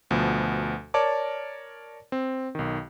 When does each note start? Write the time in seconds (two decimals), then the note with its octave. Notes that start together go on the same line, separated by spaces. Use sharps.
0.11 D2 B2 F3
0.94 A#4 C#5 D5 A5 D6
2.12 C4
2.55 B1 D#3